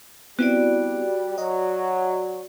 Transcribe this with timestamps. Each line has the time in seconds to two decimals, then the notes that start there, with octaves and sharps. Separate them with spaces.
0.39 G3 B3 C4 E4 F#4 D5
1.38 F#3 D#5